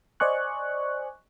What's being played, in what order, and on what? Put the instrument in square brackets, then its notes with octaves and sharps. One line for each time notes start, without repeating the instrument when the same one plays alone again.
[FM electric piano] C5 D5 D#5 G#5 C#6 F#6